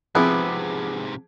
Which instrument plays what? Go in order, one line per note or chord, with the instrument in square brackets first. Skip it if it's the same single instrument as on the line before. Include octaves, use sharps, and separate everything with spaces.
[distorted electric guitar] G#2 C3 [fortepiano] F3 C4 [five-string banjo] B3 E4 [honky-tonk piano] G#4 D6